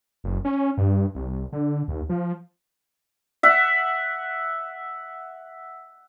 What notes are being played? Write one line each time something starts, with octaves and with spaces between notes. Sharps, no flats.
F#1
C#4
G2
C2
D3
D#2
F3
E5 F#5